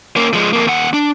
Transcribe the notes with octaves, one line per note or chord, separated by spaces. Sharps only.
A#3 C#4
F3 G#3
F2 A#3
D#2 F#5
D4